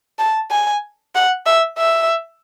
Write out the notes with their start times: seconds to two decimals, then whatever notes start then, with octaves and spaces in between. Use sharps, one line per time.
0.19 A5
0.51 G#5
1.15 F#5
1.46 E5
1.78 E5